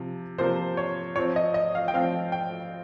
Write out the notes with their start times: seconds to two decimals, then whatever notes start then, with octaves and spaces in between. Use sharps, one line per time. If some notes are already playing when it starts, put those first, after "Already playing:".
Already playing: C3 F3
0.38 C3 F3 A#3 C5
0.77 C#5
1.16 F3 C4 C#5
1.36 D#5
1.54 D#5
1.75 F5
1.88 G5
1.94 F3 C4 F5
2.32 G5